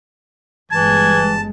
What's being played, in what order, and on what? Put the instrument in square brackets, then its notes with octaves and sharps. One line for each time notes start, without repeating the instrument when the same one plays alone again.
[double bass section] G1 G2 G#3 [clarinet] E3 [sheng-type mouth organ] A5 [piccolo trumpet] G#6